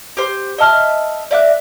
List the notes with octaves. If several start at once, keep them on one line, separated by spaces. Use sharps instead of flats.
G4 C5
D#5 E5 A5 F6
D5 E5 D6 F#6